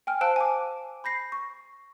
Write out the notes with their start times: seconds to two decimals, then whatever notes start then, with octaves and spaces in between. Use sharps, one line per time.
0.07 G5 G#5 F6
0.21 C5 F5 A5 E6 F#6 D7
0.36 G#5 D6
1.04 B5 G6 A#6 C7
1.32 C#6